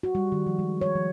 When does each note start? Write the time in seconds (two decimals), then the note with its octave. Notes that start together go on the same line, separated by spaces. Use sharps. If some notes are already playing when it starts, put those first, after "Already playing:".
0.03 F#4
0.15 G3
0.32 D#3
0.47 F3
0.59 G#3
0.81 C#5
0.95 F3